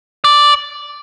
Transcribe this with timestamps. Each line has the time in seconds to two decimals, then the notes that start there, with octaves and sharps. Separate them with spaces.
0.24 D5